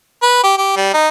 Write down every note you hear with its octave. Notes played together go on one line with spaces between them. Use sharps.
B4
G4
G4
G3
D#4